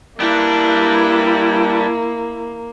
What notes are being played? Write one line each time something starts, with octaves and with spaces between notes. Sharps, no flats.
G3 A#3 D4 E4